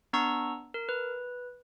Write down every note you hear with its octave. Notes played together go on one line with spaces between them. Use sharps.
B3 D4 A#5 C#6 E6
A#4
B4